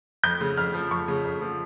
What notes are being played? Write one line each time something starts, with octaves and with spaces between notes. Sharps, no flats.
F2 G6
C#3
F2 F6
F3
F2 C#6
C#3
F2
F3